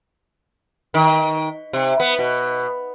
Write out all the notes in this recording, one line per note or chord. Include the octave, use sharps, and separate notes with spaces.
D#3
C3
B3
B2